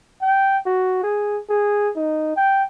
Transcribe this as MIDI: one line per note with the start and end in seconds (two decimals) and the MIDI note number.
0.22 0.58 79
0.66 0.99 66
1.04 1.38 68
1.50 1.89 68
1.96 2.36 63
2.36 2.64 79